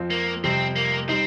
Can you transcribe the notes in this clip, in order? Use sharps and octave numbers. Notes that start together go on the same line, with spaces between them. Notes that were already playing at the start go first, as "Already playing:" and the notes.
Already playing: F2 F3 C4 F4
A#3
F2 C3 G3 C4
A#3
G3 C4 D#4